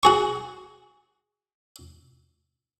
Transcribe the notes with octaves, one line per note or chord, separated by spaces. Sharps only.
F#4 G#4 C#6